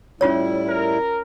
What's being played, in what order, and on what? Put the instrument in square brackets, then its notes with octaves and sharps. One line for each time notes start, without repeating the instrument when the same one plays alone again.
[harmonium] A2 G3 E4 [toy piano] C#4 F4 C#5
[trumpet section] A#4